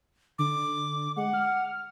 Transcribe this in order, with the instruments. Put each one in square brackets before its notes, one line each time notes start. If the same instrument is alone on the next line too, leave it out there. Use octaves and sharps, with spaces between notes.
[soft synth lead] D3 [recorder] D6
[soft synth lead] G#3 [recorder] F#5
[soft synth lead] F6